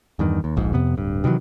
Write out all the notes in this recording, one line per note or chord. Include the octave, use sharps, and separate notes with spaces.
E2 G2 D#3
D#2
D1 A#1 G#2
F2 C3 B3
D1 G2
C3 D#3 E3 F#3